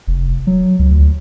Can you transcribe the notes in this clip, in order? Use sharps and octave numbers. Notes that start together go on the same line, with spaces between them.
F1
F#3
C#2
D2